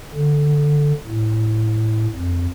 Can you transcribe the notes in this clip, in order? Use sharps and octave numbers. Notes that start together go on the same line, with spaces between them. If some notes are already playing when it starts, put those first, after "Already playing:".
D3
A2
F2